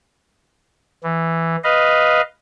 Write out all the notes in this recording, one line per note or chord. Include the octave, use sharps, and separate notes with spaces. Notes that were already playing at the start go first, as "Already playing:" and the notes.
E3
B4 D#5 F5